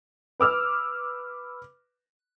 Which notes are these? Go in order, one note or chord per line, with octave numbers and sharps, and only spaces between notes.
B4 D6 E6 F6